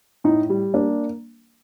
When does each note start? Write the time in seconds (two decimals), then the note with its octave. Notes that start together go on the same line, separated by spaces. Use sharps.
0.24 A2 D#4
0.50 G3
0.74 A#3 D4